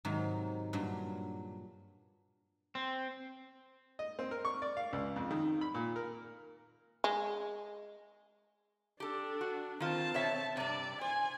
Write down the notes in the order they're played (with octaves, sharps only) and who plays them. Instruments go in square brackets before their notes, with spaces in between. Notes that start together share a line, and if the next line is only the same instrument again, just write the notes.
[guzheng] G#2 C3 D#3 F#3
G2 A#2 F#3
[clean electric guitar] C4
[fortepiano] D#5
C4
A#4
C#6
D5
F5
C#2
F2
D#3
B5
A#2
A#4
[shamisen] G#3
[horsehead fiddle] D4 [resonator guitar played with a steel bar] G4 A4
[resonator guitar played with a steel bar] F#4
[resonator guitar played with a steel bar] D#3 F4 [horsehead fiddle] C4 A5
[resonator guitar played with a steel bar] B2 C#5 E5
[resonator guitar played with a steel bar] G2 C3 [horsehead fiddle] D5
[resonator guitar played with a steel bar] C5 [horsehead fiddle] G#5